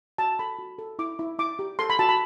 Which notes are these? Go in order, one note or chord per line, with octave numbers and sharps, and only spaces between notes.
F#4 A5
A4 B5
F#4
A4
E4 D6
E4
E4 D6
G4
A4 C6
B5
F#4 A5
B5